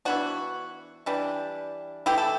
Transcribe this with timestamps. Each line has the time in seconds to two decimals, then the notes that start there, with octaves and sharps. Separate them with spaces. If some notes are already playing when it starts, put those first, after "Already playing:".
0.05 E3 B3 D4 F#4
1.06 E3 G3 D4
2.06 E3 A3 E4 G4
2.18 A4